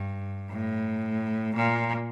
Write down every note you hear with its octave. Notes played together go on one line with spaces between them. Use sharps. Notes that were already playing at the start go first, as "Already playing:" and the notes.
Already playing: G2
A2
A#2